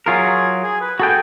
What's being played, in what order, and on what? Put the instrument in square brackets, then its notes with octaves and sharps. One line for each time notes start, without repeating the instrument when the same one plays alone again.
[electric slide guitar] F#3 F4 A#4 [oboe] G#4
[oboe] G#4
B4
[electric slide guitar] F#4 A4 G5 [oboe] G#4